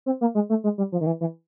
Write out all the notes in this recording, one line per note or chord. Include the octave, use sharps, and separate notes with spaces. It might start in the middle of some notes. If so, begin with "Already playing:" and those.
C4
A#3
G#3
A3
G#3
G3
F3
D#3
E3
E3